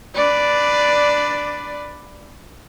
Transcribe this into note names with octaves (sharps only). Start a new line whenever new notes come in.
D4 B4 D5